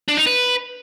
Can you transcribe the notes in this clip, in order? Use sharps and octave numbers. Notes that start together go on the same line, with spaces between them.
D4
D#4
B4